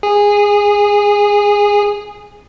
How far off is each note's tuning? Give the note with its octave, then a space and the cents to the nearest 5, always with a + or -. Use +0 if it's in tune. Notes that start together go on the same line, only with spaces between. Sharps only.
G#4 -15